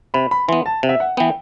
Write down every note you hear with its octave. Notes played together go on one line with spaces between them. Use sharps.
C3 B5
B5
E3 B3 C6
A5
C3
E5
F#5
E3 B3 G5